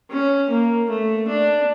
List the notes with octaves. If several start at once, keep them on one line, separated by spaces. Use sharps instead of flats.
C#4
A#3
A3
D4